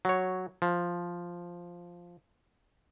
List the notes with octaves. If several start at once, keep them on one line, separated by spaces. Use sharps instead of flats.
F#3 C#5
F3